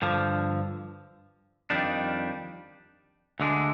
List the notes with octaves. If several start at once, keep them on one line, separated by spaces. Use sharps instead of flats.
G2 D3 F3
F2 D#3 G3 D4
D2 D3 G#3 D4